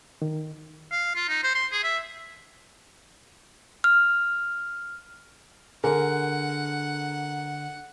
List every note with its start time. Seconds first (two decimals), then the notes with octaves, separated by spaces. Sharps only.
0.22 D#3
0.92 F5
1.16 F4
1.29 D#4
1.44 C5
1.55 C6
1.72 G#4
1.84 E5
3.84 F6
5.84 D3 G#4 A#4 F#5 G#5